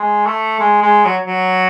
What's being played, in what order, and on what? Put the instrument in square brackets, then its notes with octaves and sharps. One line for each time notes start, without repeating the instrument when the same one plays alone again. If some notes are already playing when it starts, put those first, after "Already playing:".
Already playing: [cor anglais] G#3
A3
G#3
G#3
F#3
F#3